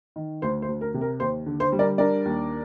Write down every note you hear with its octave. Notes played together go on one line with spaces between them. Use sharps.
D#3
D2 C5
C5
D2
A#4
C3
A#4
D#2 C5
D3
C5
G3
A#4 D5
D4 A#4 D5
D#2